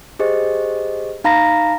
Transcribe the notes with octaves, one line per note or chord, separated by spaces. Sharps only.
G4 G#4 C5 D#5
D#4 F5 A#5 B5 A#6